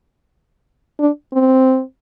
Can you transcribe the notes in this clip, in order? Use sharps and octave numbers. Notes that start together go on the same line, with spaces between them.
D4
C4